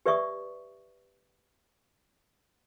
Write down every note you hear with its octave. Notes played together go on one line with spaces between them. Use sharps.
G4 B4 D5 E5 C#6 D#6